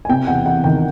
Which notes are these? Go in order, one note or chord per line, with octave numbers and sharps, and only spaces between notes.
G#5
C3 G5
E2 F#5
E2 F#5
D#3 G5